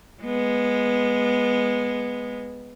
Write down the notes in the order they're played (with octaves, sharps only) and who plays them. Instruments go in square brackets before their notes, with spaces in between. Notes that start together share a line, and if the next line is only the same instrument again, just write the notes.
[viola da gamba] G#3 B3